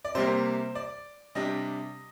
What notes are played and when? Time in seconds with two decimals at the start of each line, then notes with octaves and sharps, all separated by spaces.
0.05 D5
0.15 C3 G3 A#3 C5
0.75 D5
1.35 C3 G3 D4 D#5